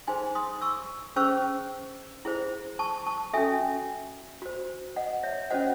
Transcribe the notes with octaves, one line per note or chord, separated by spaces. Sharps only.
D#4 G#4 C5 G#5 C6
C6 D#6
C#6 E6
C#4 G#4 C5 C#6 E6
E4 G#4 C5
A5 C#6
A5 C#6
C#4 F#4 A4 E5 G#5
F#4 C5
D#5 F#5
C#5 E5
C#4 F#4 C5 D#5 F#5